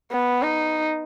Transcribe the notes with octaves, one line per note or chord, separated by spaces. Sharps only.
B3
D#4